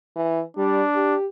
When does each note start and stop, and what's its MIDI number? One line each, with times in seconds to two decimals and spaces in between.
0.16 0.41 52
0.57 0.82 55
0.57 1.16 62
0.95 1.26 67